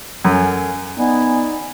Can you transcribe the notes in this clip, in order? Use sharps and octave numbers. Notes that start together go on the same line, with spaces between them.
F#2 A4 A#4 G#5
B3 D#4 D5 G#5